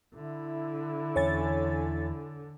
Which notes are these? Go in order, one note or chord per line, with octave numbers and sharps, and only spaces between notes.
D3 E4
E2 C#4 C#5 G#5 A6